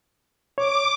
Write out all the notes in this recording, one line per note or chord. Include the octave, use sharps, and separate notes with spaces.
C#5 D6